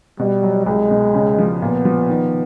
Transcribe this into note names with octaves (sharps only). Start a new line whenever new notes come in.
B2 G3
F#3
C2 G#3
B2
C#3
F3
A#2 B3
F3
D#3